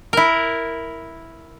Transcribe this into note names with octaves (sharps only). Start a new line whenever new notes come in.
E4 A#4